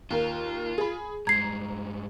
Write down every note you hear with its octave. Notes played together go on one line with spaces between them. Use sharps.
D#2 A#3 F4 A#4
G#4 B5
G2 G#3 A#5 G#6 C7